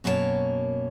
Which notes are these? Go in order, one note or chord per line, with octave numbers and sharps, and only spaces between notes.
F#2 B2 A#3 E4 C#5 A5